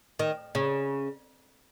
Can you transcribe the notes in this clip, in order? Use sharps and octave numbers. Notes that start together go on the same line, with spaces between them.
D#3
C#3